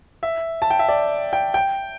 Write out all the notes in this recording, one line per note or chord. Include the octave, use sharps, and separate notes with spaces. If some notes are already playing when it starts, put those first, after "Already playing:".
E5
A5
G5
E5
D5
G5
G5